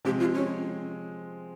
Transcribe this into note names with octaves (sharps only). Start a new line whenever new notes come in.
C3 F3 G#3 C4 G4
F4
C#4